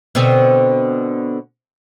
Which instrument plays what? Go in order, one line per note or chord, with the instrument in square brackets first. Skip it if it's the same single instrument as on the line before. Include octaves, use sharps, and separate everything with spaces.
[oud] B2 D3 C4